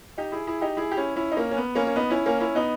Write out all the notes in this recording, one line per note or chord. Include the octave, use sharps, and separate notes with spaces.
D#4 G4
E4 G#4
E4 G#4
D#4 G4
E4 G#4
G4
C#4 E4
C#4 E4
D#4
A#3 C#4
C#4
B3
A#3 C#4
C#4
B3 D#4
C#4 E4
A#3 C#4
C#4 E4
B3 D#4